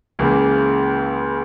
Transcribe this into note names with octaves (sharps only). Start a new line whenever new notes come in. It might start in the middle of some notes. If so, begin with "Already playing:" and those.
C#2 C#3 E3 A#3